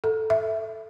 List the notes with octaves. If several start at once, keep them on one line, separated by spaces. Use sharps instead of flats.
A4
E5